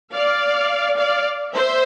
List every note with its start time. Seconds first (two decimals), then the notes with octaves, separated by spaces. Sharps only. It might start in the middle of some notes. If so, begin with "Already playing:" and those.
0.13 D5 F5
0.97 D5 F5
1.54 C5 E5